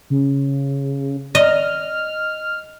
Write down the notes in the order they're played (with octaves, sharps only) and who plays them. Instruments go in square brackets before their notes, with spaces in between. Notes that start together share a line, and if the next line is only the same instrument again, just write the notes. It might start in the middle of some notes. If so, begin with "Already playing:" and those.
[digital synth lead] C#3
[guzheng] D#5 [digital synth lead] F6